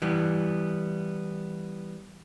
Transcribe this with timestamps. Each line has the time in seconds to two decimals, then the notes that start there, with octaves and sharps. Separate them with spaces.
0.02 E3 G3 B3